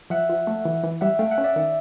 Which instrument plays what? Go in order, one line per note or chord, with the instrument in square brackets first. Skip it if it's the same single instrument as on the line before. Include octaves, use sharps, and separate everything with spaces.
[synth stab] F3 [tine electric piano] E5 F#5
[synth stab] F3
A3
E3
E3
[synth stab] G3 [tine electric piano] E5 F#5
[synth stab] A3 [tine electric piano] F5 G5
[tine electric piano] E5 F#5
[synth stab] C#4
[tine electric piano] D5 E5
[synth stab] D#3